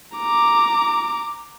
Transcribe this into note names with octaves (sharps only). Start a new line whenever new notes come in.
A#5 D6